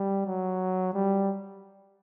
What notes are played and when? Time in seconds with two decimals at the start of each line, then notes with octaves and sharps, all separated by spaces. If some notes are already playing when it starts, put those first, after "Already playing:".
Already playing: G3
0.26 F#3
0.94 G3